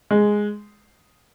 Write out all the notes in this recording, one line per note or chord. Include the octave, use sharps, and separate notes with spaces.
G#3